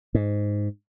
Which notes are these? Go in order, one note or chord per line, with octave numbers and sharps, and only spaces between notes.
G#2